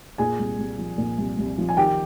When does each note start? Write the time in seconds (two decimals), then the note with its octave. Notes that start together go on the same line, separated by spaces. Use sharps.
0.18 A#2 G#4 G#5
0.39 C2
0.59 C2
0.79 F3
0.98 A#2
1.18 C2
1.38 C2
1.58 F3
1.69 G#5
1.77 D#3 G4 G5